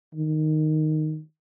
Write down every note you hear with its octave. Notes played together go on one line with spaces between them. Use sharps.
D#3